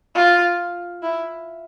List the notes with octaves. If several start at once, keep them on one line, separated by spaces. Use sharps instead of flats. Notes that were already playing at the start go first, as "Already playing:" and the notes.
F4
E4